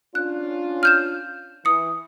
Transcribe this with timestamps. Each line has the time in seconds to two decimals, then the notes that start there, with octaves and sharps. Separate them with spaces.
0.15 C#4 D4 F4 F#6
0.83 F6 G6 E7
1.65 E3 D#6 C#7